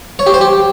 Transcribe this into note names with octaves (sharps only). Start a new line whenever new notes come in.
C#5
G4
C5
G4